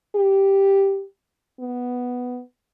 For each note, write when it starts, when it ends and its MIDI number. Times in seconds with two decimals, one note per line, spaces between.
0.15 1.04 67
1.60 2.40 59